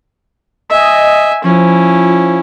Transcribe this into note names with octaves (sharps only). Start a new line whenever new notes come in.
D#5 E5 G#5
F3 C#4 E4